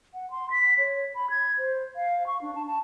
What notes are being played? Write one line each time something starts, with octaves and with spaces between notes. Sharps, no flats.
F#5
C6
B6
C#5
B5
G#6
C5
F5
C#6
D4
A5
A5